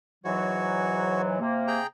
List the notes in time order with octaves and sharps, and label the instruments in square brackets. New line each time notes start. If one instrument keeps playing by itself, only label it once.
[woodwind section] G#2 E3 F#3 [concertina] F#4 C#5
[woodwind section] C3 A#3
[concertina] G#4 G5 A#5